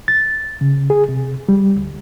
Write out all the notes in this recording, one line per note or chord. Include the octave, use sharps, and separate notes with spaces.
A6
C#3
G#4
C3
G3
D2